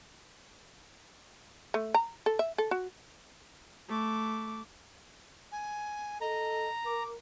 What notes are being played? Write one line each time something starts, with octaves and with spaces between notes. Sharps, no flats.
A3
A#5
A4
E5
A4
F#4
A3 D6
G#5
A4 D#5 A#5
A#4 D6